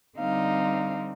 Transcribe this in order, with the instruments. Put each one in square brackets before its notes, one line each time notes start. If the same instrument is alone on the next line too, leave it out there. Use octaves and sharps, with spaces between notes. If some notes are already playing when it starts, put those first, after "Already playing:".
[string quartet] D3 G3 C4 D#4 F5